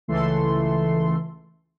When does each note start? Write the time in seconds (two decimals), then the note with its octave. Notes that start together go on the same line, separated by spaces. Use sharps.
0.08 C#2 E3 A3 A4 C6